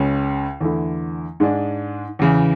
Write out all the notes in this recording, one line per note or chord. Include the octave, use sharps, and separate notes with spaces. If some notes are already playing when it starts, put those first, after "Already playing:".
Already playing: C#2 C#3 G#3 C#4
E2 D3 A3 E4
G#2 G#3 D4
E2 C#3 E3